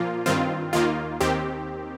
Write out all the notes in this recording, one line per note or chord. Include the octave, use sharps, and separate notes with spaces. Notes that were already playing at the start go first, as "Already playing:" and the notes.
Already playing: A#2 F3 A#3 F4
G2 D#3 C4 F4
D#2 D#3 A#3 F4
D#2 D#3 C4 G4